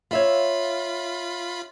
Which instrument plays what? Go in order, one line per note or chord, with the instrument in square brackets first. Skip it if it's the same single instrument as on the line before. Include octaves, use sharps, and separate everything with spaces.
[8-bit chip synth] F4 B5 [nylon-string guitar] C#5 E5 F5